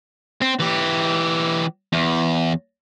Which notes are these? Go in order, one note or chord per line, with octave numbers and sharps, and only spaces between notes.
C4
E3 G4
E2